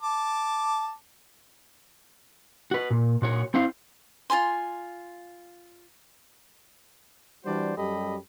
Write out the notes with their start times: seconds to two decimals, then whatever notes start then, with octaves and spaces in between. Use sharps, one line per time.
0.02 A5 D6
2.71 F#4 B4
2.90 A#2
3.22 A#2 F#4 C#5
3.54 C4 E4 C5 F5
4.30 F4 A#4 G#5 C6
7.45 E3 G3 D4 F#4 C5 D5
7.77 F#2 G3 G4 A4 D#5 B5